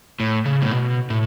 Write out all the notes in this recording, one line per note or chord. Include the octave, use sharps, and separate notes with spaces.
A2
C#3
A2
B2
A2